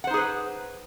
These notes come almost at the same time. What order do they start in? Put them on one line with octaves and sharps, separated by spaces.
F#5 C5 D#4 G#4 B4